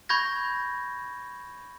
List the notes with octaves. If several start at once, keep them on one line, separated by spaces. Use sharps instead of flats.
B5 C#6 G6 G#6 A#6